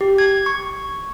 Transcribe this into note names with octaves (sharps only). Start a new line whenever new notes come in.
G4
G#6
C#6